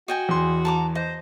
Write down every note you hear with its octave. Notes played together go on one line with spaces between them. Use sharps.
F#4 D#5 G5 G#5
E2 C6
A5 A#5 D6
C5 D#5